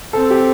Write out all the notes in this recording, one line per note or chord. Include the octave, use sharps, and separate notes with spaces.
C4 A4
G4